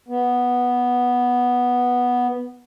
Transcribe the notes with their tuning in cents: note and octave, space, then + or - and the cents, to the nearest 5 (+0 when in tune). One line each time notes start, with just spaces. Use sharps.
B3 -5